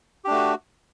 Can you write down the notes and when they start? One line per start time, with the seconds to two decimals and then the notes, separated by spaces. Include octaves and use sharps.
0.25 G4
0.28 D4
0.30 A3
0.33 F#4